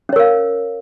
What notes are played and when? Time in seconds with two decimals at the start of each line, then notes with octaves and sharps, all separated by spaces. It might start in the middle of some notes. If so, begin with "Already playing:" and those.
0.09 C#4
0.13 C#5
0.16 A#4
0.19 F5